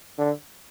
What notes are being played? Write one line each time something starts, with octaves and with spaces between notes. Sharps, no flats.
D3